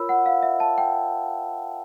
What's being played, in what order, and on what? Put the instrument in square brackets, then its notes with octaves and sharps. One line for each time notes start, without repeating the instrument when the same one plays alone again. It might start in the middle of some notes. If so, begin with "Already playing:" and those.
Already playing: [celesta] F4 A#4 C#5 B5 E6
F#5
F5
E5
A5
G5